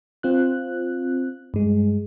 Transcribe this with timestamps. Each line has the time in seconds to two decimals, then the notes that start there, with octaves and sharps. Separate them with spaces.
0.23 C4 F4 F#6
1.54 G2 G#3